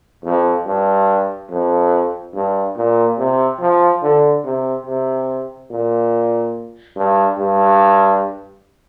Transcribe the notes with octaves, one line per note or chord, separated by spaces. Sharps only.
F2
G2
F2
G2
A#2
C3
F3
D3
C3
C3
A#2
G2
G2